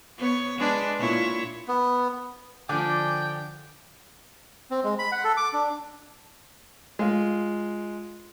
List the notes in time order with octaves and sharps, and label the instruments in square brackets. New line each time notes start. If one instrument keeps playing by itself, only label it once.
[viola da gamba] B3 C#5
G#3 D4 B4
A#2 E4 C#5
[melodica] B3
[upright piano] D3 F3 [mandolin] D4 G#5 D6 [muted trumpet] G5
[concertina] C4
G#3
B5
F#5
A4
D6
D4
[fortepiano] G#3 F4